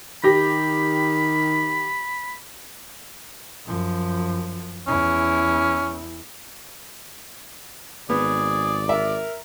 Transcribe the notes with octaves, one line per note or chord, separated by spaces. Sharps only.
D#3 G4 B5 A#6
F#2 F3
E2 C#4 E4
G#1 B3 G#4 D5
A#4 E5